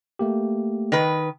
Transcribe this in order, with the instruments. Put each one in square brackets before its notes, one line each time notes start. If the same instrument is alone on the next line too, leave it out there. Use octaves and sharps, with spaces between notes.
[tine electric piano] A3 A#3 G4
[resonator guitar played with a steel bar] D#3 B4